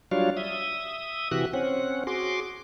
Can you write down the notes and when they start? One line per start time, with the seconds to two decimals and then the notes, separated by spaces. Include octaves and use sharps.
0.12 F#3 G3 D4 F4 C#5 F5
0.37 E5 D#6
1.31 C3 E3 F#4 G4 E5 F#6
1.53 C4 C#4 F#5
2.07 F#4 G#4 C6 D6